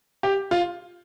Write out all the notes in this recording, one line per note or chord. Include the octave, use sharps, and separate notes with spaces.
G4
F4